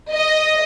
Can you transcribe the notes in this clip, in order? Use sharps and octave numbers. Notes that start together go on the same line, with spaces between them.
D#5